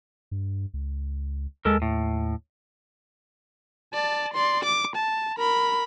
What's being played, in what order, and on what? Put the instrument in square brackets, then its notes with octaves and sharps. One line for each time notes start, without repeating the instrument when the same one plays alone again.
[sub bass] G2
C#2
[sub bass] D#2 [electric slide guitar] G#3 A4 A#4
[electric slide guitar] A2
[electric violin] D5 A5
D5 C6
D6
A5
A#4 B5